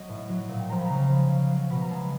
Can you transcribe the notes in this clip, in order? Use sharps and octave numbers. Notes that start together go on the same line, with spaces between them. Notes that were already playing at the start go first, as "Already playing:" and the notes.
Already playing: F#3 D#5
A2
F#3
A#2
G5
F3 G#3 A#5
B5
C#3 A#5
F3 G#3
C#3
F#3
B2 B5
A#5
G#3 A5